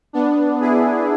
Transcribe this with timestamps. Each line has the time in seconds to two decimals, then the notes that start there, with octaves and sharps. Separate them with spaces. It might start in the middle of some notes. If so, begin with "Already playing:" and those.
0.13 B3 D4
0.61 E4 G#4